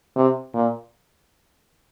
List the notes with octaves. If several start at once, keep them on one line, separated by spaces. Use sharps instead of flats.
C3
A#2